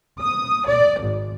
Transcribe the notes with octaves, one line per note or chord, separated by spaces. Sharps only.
D#6
D5
G#1